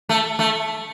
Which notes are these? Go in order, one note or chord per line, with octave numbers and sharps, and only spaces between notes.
A3
A3